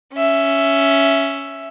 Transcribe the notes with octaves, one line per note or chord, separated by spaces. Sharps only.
C#4 E5